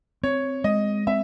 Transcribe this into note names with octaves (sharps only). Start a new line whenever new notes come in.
C4 C#5
G#3 D#5
C4 E5